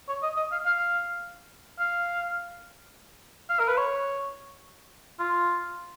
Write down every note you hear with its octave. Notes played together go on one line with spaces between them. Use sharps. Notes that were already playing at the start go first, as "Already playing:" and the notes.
C#5
D#5
D#5
F5
F5
F5
F5
A#4
B4
C#5
F4